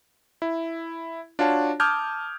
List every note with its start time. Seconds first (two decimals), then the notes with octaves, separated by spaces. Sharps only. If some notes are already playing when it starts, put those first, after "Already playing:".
0.42 E4
1.39 D4 F4 F#4 C#5 A5
1.80 A5 D6 D#6 F6 G6 G#6